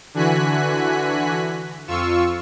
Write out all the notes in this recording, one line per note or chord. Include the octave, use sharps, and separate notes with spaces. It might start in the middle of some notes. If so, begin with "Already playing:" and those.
D3 E3 F#4 G#5 F#6 B6
F2 F4 C#6 E6